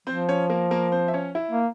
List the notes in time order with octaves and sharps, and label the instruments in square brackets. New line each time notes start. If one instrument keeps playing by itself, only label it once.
[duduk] F3 [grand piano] C4 C5
[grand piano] C#4 C#5
A#3 A#4
A#3 A#4
C4 C5
E5
C#4 C#5
E4 E5
[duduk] A#3